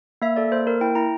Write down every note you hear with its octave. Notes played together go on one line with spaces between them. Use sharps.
A#3 E5
A4 D5
A#3 C5
A#3 A#4
E4 G5
E4 A#5